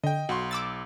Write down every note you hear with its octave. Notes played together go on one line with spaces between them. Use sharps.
D3 D#5 G5
B1 F#4 C6
D6 E6 A6